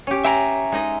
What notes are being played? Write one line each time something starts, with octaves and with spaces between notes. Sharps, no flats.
C#4 G4
E5 G5 G#5 A#5
G#3 D#4 D#5